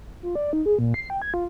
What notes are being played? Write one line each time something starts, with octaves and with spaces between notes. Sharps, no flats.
F4
D5
D#4
G#4
A#2
C7
G5
G#6
F4